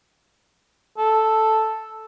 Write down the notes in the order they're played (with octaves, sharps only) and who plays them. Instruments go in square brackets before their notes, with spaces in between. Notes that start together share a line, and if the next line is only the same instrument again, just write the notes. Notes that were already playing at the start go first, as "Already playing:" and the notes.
[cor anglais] A4